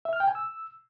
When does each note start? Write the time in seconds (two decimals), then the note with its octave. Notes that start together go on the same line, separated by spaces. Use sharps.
0.05 E5
0.13 F6
0.20 G5
0.28 G#5
0.35 E6